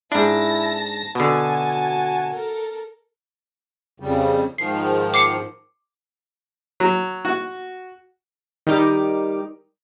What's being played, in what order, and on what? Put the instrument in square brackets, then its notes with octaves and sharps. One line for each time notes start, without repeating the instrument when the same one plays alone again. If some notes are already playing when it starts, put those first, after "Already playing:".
[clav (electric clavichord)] G#2 D4 [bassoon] E4 [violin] A5 A#6
[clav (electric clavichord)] B2 D3 [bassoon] F#4 [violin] G#5 A5
[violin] A4 A#4
[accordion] F2 C#3 G3
[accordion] G#2 D#3 F3 [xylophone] C7
[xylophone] D6 C7 C#7
[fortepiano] F#3
F#4
[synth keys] D#3 G3 D#4 G4 D6